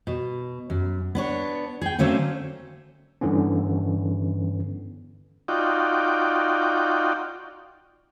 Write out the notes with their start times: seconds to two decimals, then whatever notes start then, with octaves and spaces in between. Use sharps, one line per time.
0.07 B2
0.70 F#2
1.15 B3 D4 C#5
1.81 G#4 G5
1.99 D3 F#3 A3 A#3 C4 C#4
3.21 G2 D3 E3 B3 C#4
5.48 D#4 F4 F#4 D5 G5